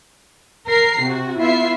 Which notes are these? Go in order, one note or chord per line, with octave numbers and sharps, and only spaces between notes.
A#4 A#5 C7
C3 F#4
B3 E4 F4 E5 C7